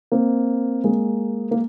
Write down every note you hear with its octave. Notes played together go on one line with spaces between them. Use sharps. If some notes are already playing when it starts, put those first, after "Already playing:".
A#3 C4
G#3 A#3
A#3